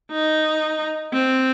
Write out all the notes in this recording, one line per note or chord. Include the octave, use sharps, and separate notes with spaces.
D#4
C4